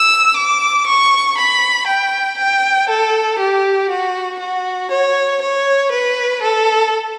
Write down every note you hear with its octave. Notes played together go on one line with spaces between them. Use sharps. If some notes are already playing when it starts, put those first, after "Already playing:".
Already playing: E6
D6
C#6
B5
G5
G5
A4
G4
F#4
F#4
C#5
C#5
B4
A4